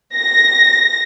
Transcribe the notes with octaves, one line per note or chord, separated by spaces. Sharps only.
A#6